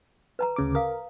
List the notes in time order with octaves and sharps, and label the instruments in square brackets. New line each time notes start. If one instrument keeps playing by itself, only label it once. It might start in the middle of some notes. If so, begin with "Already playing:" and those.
[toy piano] B4 A5 A#5
[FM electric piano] D2 C#3 D6
[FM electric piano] A#4 [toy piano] F5 D#6